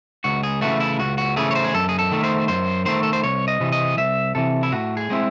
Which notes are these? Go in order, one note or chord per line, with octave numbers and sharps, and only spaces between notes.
C#2 F#4
G#4
C#3 E3 A3 F#4
E4
C#2 F#4
F#4
C#3 E3 A3 G#4
C#5
C5
G#4
F#2 A4
G#4
A4
D#3 A3
C5
F#2 C5
D#3 A3 C5
A4
C5
C2 C#5
D#5
C3 E3
D#5
C2 E5
C3 E3 A4
E4
A2 F#4
G#4
G#3 C4 E4